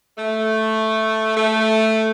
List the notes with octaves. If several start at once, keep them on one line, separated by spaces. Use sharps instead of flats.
A3
A3